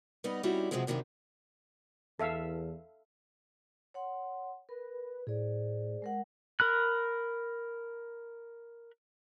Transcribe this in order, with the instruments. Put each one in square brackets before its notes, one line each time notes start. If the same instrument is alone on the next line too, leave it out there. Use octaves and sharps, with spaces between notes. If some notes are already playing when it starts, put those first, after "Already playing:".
[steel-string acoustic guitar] G3 B3 D#4 B4 D#5
G3 C4 C#4 D#4 E4 F#4
C3 D#3 F3 F#3 G#3 C4
F#2 C3 D#3 E3 D4
[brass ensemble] E2 [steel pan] A4 E5 F5
[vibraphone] C#5 F#5 C6
[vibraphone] A#4 [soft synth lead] B4
[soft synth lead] A2 [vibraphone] G#4 C5 D5
[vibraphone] G#3 A#4 F#5
[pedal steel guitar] A#4 B5 F#6